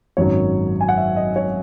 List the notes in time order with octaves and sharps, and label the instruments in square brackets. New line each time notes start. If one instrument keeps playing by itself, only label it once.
[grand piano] G#1 F#2 D#3 F#3 C#5
G#5
F#5
E5
D#5
C#5